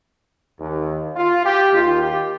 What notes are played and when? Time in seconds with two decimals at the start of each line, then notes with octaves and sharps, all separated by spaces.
0.59 D#2 D#3
1.16 F4
1.45 G4
1.73 D#2 D#3 F4
2.01 G4